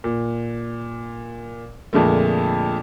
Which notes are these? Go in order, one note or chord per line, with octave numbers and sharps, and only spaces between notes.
A#2
F2 A#2 D3 G#3 A3